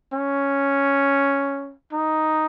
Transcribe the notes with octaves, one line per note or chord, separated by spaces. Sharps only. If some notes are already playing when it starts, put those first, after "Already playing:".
C#4
D#4